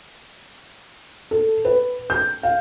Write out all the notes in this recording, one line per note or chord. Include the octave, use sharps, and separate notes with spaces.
A4
B4
G6
F5